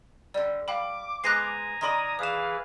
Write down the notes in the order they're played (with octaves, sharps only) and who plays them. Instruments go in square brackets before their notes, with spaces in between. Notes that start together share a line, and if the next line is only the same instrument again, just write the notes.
[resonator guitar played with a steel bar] D3 G3 [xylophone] D5
[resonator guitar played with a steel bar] G3 [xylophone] F5 G5 B5 [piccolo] D6
[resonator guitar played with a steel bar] G#3 B3 C5 [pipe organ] G#5 A#5 [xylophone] F#6 A#6 C7
[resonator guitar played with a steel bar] D#3 D5 [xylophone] B5 C6 A#6 [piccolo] D#6
[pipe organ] E3 G#4 B4 [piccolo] F5 [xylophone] D#6 E7